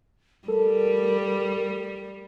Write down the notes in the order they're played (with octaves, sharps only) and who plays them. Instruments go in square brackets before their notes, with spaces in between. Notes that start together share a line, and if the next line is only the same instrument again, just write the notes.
[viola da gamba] G3 [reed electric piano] A4 [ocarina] A#4